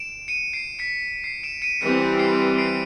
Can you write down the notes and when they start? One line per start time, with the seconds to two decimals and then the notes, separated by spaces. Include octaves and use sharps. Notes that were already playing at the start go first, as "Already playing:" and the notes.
Already playing: D7 E7
0.28 C#7 D#7
0.53 C7 D7
0.79 B6 C#7
1.24 C7
1.43 D7 E7
1.62 C#7 D#7
1.81 E3 G3 C4 B6 C#7
2.19 C7 D7
2.58 C7 D7